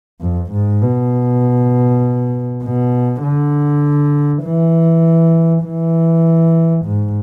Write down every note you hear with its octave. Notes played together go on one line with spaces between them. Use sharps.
F2
G#2
B2
B2
D3
E3
E3
G#2